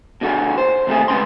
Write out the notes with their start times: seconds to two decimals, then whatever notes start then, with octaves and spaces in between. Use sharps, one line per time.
0.21 B2 D3 F#4 G#4
0.58 C5
0.87 D#2 C3 A3 G#4
1.08 C#2 B3 C#4 A5 C6